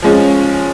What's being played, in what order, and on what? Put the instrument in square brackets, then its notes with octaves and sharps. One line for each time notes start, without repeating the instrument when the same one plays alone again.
[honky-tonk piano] F3 G#3 C#4